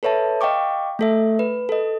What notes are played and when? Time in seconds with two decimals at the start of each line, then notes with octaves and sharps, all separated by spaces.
0.03 A4 B4 C#5 E5 A5
0.41 D#5 F5 G5 C#6 D6
0.99 A3 A4 E5
1.39 B4
1.69 A4 D#5